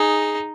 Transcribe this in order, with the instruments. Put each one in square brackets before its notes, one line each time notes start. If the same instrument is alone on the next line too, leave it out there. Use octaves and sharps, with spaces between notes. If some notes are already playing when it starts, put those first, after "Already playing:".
Already playing: [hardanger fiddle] D#4 [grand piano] G#4